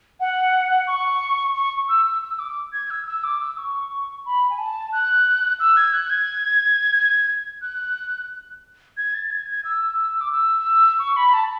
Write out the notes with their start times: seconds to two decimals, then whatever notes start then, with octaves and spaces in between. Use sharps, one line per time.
0.20 F#5
0.87 C#6
1.55 C#6
1.89 E6
2.06 E6
2.22 E6
2.39 D6
2.73 G#6
2.90 E6
3.06 E6
3.24 D6
3.41 E6
3.58 C#6
4.26 B5
4.50 G#5
4.58 A5
4.93 F#6
5.60 E6
5.77 G#6
5.93 F#6
6.10 G#6
7.62 F#6
8.97 G#6
9.14 A6
9.31 G#6
9.48 G#6
9.65 E6
10.21 D6
10.32 E6
10.99 C#6
11.16 B5
11.34 A5